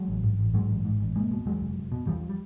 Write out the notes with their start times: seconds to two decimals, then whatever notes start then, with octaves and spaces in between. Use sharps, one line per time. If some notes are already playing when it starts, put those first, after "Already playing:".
Already playing: F#3 G#3
0.08 A1
0.23 G#2
0.39 A1
0.54 G#2 F#3 G#3
0.69 A1
0.85 G#2
1.00 A1
1.16 F1 G#3 A#3
1.31 B2
1.46 E2 F#3 G#3
1.62 F1
1.77 F1
1.92 B2
2.07 E2 F3 G3
2.29 G3